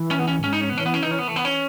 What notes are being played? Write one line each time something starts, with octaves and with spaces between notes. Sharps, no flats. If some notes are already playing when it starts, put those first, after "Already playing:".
Already playing: E3
C#4
B3
C#4
G#2 C#4
D#4
C#4
B3
E3 C#4
B3
C#4
D#4
C#4
B3
A3
B3
C#4